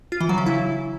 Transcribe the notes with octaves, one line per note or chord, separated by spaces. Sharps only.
F4
E3
F#3
C#3
E4